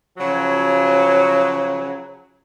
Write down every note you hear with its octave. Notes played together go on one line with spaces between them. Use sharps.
C#3 F3 F#3